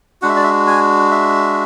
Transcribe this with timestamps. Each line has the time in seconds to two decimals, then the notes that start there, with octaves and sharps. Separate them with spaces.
0.22 G#3 D4 F#4 F#5
0.29 E5
0.36 D5
0.43 E5
0.67 G#5
1.11 E5